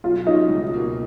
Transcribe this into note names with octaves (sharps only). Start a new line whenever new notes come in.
B1 F4
B2 F#3 C#4 D#4 F4
C#2
B2 A#3 D#4